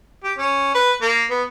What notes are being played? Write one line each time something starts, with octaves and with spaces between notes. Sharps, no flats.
G4
C#4
B4
A#3
B3